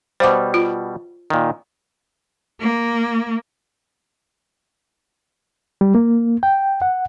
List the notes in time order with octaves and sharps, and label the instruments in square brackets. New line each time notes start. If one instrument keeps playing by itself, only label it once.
[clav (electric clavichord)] B2 G3 [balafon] C5 F5 D6
[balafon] F4
[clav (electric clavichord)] A#2 D#3
[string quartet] A#3
[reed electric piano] G3
A#3
G5
F#5